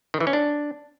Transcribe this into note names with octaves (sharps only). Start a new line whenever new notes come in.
D#3
E3
C#4
D4